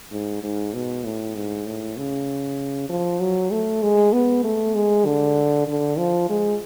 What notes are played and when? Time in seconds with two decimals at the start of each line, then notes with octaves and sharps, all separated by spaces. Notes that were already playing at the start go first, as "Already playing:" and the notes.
0.12 G#2
0.43 G#2
0.74 B2
1.05 A2
1.36 G#2
1.66 A2
1.97 C#3
2.89 F3
3.21 F#3
3.52 A3
3.83 G#3
4.13 B3
4.44 A3
4.75 G#3
5.06 D3
5.68 D3
5.98 F3
6.29 G#3